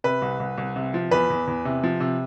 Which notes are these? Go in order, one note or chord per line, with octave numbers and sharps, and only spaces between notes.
C3 B4
C2
C2
C2
C3
F3
E2 B4
E2
E2
C3
F3
C3